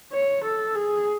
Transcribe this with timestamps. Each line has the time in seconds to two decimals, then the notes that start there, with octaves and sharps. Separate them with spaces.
0.13 C#5
0.44 A4
0.75 G#4